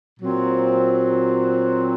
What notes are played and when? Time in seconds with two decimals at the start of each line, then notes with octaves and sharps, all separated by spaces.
0.20 A#2 F#3 C4